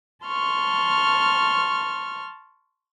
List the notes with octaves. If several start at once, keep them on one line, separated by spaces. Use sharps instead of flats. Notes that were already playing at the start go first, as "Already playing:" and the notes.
A5 C6 C#6 F6